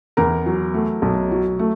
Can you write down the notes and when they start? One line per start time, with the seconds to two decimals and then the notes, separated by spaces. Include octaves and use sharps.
0.17 E2 A#4 A#5
0.46 F#3
0.74 A3
1.02 B1
1.32 F#3
1.59 A3